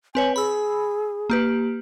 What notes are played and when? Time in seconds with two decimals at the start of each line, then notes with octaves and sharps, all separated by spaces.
0.15 C4 B4 C#5 G#5
0.36 G#4 B5 E6
1.30 A#3 G4 B4